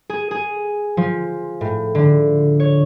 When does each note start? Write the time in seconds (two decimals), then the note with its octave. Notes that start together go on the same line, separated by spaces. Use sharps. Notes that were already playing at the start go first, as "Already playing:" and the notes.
0.10 G#4
0.31 G#4
0.97 F3
1.61 A2
1.95 D3
2.60 C#5